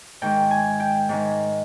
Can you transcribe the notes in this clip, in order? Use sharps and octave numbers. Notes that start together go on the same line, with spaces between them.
G#2 D#3 G#3 G5
G#5
G5
G#2 D#3 G#3